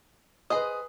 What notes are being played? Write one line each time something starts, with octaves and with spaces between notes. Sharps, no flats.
G#4 B4 C5 D#5 D#6